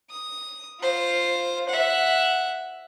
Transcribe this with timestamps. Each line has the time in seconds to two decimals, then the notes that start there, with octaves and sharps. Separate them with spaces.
0.10 D#6
0.81 F4 C5
1.69 E5 F#5